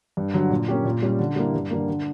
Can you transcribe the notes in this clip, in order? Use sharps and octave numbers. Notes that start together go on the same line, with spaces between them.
G2
D3 F#3
A#2
A#3 C#4 G4
A#2
G3 C#4 G4
D3
G3 A#3 E4
G2
D3 G3 A#3
D3